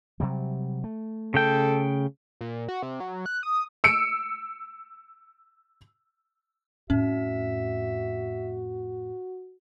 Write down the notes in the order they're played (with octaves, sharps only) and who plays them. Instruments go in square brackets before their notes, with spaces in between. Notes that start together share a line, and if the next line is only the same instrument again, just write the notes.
[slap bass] C3 F#3 G3
A3
[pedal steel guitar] C#3 G5 [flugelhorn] A4
[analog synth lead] A#2
F#4
C3
F#3
F#6
D#6
[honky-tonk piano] E6 C#7 D7
[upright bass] F2 A2 [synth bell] C#4 [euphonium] F#4 [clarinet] E5